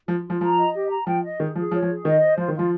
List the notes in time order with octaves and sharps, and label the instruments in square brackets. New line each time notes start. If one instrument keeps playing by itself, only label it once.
[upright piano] F3 [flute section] F4
[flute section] F4
[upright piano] F3
[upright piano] F3 [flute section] A#5
[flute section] D#5
G4
A#5
[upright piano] F3 [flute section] G5
[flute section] D#5
[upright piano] D#3 [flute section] G#4
[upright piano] F3 [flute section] G#4
[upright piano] F3 [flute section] C#5
[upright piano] F3
[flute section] G#4
[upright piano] D#3 [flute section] D#5
[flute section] C5
[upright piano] F3 [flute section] F4
[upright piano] D#3
[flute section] F4
[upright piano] F3